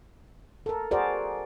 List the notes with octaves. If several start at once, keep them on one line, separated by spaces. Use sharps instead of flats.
A4 A#4
F#4 G#4 A#4 C5 D5